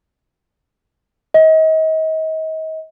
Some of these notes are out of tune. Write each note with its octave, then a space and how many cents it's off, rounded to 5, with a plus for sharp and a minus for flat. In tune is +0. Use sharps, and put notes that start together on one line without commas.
D#5 +35